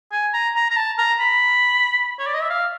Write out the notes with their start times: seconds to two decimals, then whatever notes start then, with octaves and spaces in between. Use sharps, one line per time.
0.12 G#5
0.34 A#5
0.56 A#5
0.70 A#5
0.77 A5
0.98 A#5
1.20 B5
2.19 C#5
2.27 D5
2.34 D#5
2.42 E5
2.50 F5